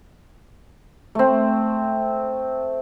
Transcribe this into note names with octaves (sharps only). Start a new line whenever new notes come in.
A3 C4